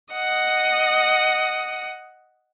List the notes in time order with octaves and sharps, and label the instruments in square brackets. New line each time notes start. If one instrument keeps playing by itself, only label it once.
[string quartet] D#5 F#5 D#6